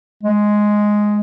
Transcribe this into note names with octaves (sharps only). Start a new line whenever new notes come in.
G#3